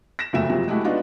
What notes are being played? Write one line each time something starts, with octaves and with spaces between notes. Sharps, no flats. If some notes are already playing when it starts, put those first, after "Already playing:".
A#6 E7
F#1 F2 F#3 A3 E5 E7
F2 C3 F3 F#3
G#3 A3 E4 F#4 G4
B3 D4 D#4 F4 F#4